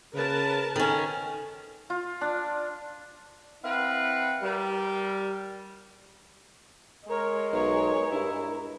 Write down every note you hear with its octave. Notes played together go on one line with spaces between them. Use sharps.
C#3 A#4 B4 A5
D#3 C#4 A4
F4
D4
C4 E4 B4 F5 F#5 B5
G3 A#4
G#3 A#4 C#5
B1 C#5
G2 E4